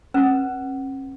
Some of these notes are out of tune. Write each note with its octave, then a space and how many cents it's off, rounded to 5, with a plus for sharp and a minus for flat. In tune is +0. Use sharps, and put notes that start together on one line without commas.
C#4 -45 B4 -25